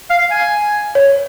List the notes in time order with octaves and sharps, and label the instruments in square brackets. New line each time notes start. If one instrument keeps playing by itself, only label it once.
[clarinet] F5
G#5
[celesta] C#5